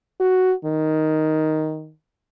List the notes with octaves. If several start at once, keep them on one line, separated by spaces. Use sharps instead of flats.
F#4
D#3